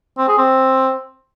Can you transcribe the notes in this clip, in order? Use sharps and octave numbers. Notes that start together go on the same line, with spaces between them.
C4
G#4
C4